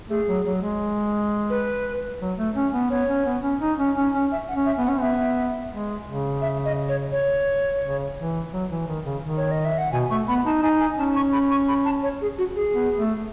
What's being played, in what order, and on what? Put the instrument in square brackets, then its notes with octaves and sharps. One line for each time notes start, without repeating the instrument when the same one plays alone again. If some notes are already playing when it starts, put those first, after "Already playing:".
[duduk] A3 [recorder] G#4
[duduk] F#3
F#3
G#3
[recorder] B4
[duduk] F#3
A3
C#4
B3
[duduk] B3 [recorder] C#5
[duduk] C#4
B3
C#4
D#4
C#4
C#4
C#4
[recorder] E5
F#5
[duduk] C#4
[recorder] E5
[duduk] B3
[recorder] F#5
[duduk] C#4
[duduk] B3 [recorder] E5
[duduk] G#3
C#3
[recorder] E5
D#5
C#5
C#5
[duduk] C#3
E3
F#3
E3
D#3
C#3
D#3
[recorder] C#5
D#5
E5
F#5
[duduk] B2 [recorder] G#5
[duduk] A3 [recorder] C#6
[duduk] B3 [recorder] B5
[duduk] D#4 [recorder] A5
[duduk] D#4 [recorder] G#5
[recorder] G#5
[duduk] C#4 [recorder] A5
[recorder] C#6
B5
C#6
B5
A5
C#5
G#4
F#4
G#4
[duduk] B3
A3